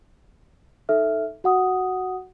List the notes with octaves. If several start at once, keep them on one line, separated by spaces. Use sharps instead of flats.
D#4 A4 E5 F6
F#4 F#5 D#6